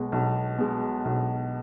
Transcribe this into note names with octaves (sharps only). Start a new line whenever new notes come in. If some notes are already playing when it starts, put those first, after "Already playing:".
Already playing: B1 B2 G#3
B1
B2 G#3
B1